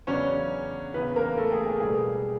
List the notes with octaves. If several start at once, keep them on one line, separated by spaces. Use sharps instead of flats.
E2 C#3 F#3 B3 C#4 D4 C#5
E2 C#3 E3 B3 B4
A#3 A#4
A3 A4
G#4
G#4
C#2 B2 G3 B3 G#4